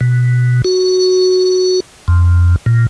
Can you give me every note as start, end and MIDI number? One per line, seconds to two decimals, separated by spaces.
0.01 0.62 47
0.64 1.80 66
2.08 2.56 41
2.66 2.87 46